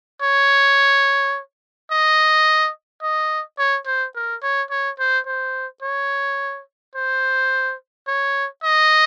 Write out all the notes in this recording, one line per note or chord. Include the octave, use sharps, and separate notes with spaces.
C#5
D#5
D#5
C#5
C5
A#4
C#5
C#5
C5
C5
C#5
C5
C#5
D#5